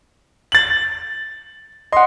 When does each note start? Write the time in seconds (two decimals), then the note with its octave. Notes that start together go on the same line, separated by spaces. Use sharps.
0.52 A6 F#7
1.92 D#5 F#5 C6